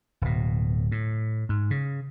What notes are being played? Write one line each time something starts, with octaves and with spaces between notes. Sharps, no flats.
D1 B2
A2
G#2
C#3